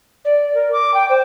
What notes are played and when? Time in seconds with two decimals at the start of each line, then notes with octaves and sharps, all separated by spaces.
0.24 D5
0.54 A#4
0.72 D6
0.94 G5
1.09 C5